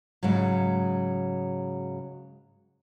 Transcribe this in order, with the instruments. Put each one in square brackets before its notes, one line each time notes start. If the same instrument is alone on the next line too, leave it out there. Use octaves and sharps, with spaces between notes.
[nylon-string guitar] G#2 C#3 F#3